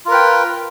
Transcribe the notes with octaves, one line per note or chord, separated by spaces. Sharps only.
F4 A#4 B4 G5